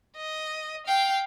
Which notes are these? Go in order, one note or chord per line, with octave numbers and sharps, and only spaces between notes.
D#5
F5 G5